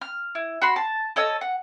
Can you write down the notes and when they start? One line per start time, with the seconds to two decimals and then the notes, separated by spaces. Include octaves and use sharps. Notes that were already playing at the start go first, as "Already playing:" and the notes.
0.01 F6
0.35 E4
0.62 F#4 B5 C6
0.76 A5
1.16 A4 C#5 D#5 E6
1.41 F#5